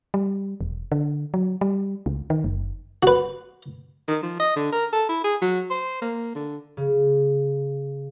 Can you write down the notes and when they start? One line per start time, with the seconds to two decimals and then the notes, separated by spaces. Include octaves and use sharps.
0.14 G3
0.61 E1
0.92 D3
1.34 F#3
1.61 G3
2.06 C#2
2.30 D#3
2.44 F#1
3.03 F#4 B4
4.08 D#3
4.22 F3
4.40 D#5
4.56 D3
4.72 A#4
4.93 A4
5.09 E4
5.24 G#4
5.41 F#3
5.70 C5
6.02 A#3
6.35 D3
6.77 C#3